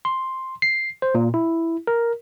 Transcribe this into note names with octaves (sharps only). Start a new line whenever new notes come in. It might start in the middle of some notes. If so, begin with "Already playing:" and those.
C6
C7
C5
A#2
E4
A#4